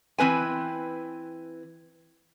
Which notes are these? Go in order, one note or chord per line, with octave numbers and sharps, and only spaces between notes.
E3 C4 B4 G#5